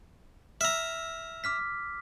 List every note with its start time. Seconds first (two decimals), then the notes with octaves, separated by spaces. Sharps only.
0.61 E5 A#5 E6 F6
1.44 D6 F6 B6